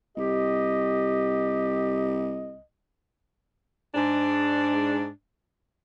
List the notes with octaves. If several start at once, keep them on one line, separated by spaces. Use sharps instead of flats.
C2 G4 D#5
G#2 D4